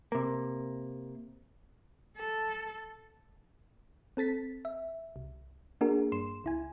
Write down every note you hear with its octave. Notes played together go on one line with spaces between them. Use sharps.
C3 A#3
A4
C4 A4 A6 B6
E5
C2
A#3 D4 F#4 G#4 A#4
G2 C6 E7
C#2 E4 G#5